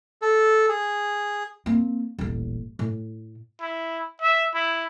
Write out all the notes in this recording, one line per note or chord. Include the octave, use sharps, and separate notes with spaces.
A4
G#4
A#3 C4
D#1 A1
A2
E4
E5
E4